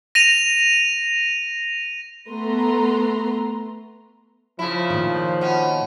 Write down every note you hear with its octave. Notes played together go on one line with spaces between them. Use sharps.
A#6 D#7 F7
A3 B3 B4 A#5 C6
C#3 F3 E4
A#2 D#3
B2 C#4